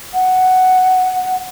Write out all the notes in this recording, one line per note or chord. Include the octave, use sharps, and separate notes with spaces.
F#5